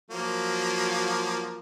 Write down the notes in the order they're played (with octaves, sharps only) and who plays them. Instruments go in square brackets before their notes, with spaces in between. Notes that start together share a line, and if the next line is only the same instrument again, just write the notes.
[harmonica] F3 F#3 A#3